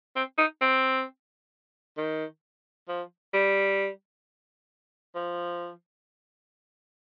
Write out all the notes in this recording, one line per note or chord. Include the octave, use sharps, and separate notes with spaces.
C4
D#4
C4
D#3
F3
G3
F3